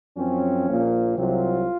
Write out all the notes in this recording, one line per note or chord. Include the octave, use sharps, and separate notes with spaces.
F#2 F3 C4 C#4
A#1 A#2 F3 A#3
C2 C3 F#3 C4 F4